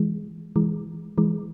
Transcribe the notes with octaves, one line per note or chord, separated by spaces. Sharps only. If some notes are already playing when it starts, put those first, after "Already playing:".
Already playing: E3 G#3
E3 G#3
E3 G#3